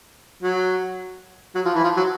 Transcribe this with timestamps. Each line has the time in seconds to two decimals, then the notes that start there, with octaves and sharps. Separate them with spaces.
0.42 F#3
1.55 F#3
1.65 F3
1.74 E3
1.83 F3
1.97 F#3